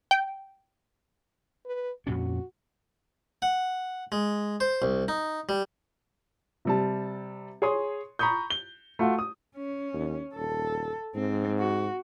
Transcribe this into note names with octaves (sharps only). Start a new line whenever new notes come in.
G5
B4
F2 A#2 C#4 F#4
F#5
G#3
C5
C2
D#4
G3
C3 G3 A5
G#4 C#5 C6 D#6
A#5 B5 C#6 D#6 G6
G7
A3 F4 F#4
D#6
C#4
D#2
D#1 A4
G#2 C4
F#4